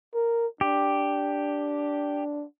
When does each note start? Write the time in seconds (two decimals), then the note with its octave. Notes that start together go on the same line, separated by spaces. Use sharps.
0.14 A#4
0.61 D4 G4